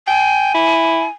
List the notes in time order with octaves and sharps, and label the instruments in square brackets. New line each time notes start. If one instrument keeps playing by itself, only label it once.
[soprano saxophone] G5 [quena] G#5
[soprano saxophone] E4